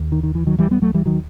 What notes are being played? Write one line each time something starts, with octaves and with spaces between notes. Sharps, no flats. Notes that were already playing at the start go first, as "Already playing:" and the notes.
Already playing: D#2
D#3
D#3
E3
D#3 F#3
E3 G3
G3 B3
F#3 A3
E3 G3
D#3 F#3